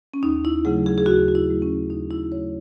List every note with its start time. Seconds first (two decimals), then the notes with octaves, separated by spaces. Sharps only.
0.14 C#4
0.23 D#2 D#4
0.45 E4
0.65 C#3 F#3 A3 G#4
0.86 G#4
0.98 G#4
1.06 D#2 F#4
1.28 F#4
1.35 E4
1.48 C#3 F#3 A3
1.62 C#4
1.90 D#2 D#4
2.11 E4
2.32 C#3 F#3 A3 C#5